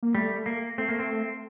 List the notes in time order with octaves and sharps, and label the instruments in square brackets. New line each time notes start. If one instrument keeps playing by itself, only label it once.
[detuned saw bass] A#3
[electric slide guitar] G3 [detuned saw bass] A3
[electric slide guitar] A#3
[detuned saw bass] A3 [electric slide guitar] C4
[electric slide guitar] A#3
C4